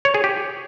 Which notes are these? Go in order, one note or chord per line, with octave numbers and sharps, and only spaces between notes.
C#5
G#4
G4